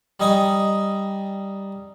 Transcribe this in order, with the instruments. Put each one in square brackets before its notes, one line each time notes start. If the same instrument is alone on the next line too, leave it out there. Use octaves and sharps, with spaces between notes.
[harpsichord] G3 D#4 D#5 G#5 C#6 D#6